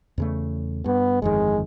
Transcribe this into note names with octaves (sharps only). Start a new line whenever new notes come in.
E2 C#3 A3
G2 B3
G1 F2 D#3 G#3